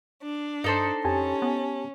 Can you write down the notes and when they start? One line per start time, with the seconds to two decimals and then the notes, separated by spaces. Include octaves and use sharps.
0.22 D4
0.64 G2 D#4 A4 C5
1.05 F2 C#4 G4 G#5 A5
1.42 B3